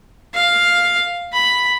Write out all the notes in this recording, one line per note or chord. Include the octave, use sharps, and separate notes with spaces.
F5
B5